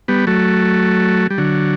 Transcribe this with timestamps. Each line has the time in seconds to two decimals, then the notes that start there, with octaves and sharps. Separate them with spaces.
0.08 G3 B3
0.27 F#3 A3
1.30 G3
1.38 D3 F#3